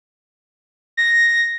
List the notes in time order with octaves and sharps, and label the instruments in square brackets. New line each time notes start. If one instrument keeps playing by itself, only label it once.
[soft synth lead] A#6